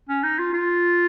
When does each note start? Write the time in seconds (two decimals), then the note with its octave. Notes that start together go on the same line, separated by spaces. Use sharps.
0.09 C#4
0.23 D#4
0.39 F4
0.53 F4